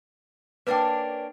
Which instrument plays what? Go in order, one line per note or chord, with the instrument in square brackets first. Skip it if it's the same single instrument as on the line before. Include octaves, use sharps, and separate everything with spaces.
[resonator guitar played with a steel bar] A#3 C#4 D4 [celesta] B4 G5